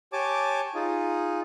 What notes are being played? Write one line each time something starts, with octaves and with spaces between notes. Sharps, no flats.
G4 C#5 G#5 A5 D6
D#4 F4 G#4